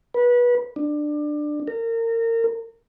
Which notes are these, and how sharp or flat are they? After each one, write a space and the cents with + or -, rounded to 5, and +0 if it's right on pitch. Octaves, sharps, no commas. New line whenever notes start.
B4 -25
D4 +20
A#4 -30